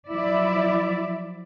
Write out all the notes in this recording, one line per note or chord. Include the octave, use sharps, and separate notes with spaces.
F3 F#3 E4 D5 E5